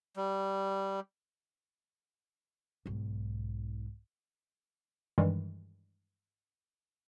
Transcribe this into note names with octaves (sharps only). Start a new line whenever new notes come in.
G3
B1 G#2
G2 D#3 E3 G3 G#3